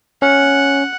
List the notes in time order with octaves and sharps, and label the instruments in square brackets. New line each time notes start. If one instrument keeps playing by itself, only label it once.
[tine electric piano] C#4 [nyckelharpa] F#5